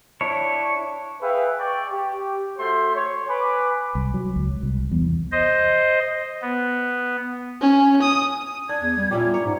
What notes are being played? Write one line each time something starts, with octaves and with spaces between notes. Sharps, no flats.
D4 E4 C#5
G#4 B4 E5 F5 G5
D5 G5 C#6
G4
A3 F#4 C5 C6
C#5
B4 G#5 B5 D6
C2
F#3
C#2
C2
E2
C5 D#5
B3
C#4
D#6
D4 G#6
E2
G3
A#2 G3 C#4 E4 D6
C#5 A#5
G#2